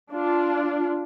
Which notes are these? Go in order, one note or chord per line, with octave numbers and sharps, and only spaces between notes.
D4 F4